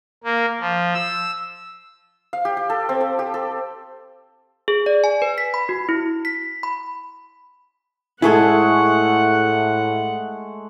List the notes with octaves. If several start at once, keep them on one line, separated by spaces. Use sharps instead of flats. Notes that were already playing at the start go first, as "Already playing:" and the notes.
A#3
F3
E6
F5
G4
G4
A4
C4
A4
G4
A4
G#4
D5
G#5
B4
B6
B5
F#4
E4
B6
B5
A2 G#3 A3 E4 G#4 A4 F#5